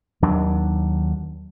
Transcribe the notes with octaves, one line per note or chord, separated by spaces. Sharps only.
D#2 F#3 D4